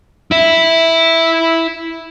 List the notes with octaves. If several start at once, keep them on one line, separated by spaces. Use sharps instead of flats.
E4 E5